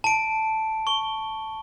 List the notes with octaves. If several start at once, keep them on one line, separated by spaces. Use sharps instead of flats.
A5 D7
C#6 G7